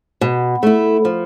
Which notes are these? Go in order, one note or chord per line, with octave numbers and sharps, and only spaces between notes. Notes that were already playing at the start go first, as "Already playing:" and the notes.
B2
A3 E4
F3